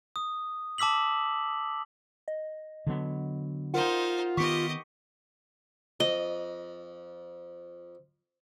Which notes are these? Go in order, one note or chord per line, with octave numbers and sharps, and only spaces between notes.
D#6
A5 D6 E6 B6 F#7
D#5
D3 F#3 B3
D#4 F4 A#4 C5 F#5
D#3 B3 G4 D#5 C#6 B6 C#7
F2 D#5